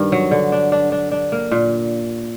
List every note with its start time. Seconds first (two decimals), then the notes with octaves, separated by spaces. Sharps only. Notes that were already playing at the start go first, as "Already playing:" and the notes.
Already playing: G2 D#3
0.12 F#3
0.31 D3
0.52 D4
0.72 D4
0.92 D4
1.11 D4
1.32 A#3
1.51 A#2